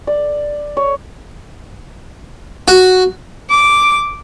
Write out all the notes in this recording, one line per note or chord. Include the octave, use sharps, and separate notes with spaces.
D5
C#5
F#4
D6